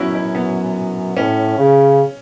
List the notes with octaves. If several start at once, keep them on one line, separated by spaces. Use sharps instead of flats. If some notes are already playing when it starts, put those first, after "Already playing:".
Already playing: F#2 B3 C#4 E4 F#4
E4
B3
A2 C#4
C#3